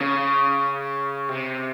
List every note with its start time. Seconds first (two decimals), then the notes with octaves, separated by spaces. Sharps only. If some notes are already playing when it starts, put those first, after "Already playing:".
0.01 C#3
1.29 C3